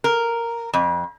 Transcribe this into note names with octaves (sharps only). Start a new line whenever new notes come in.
A#4
F2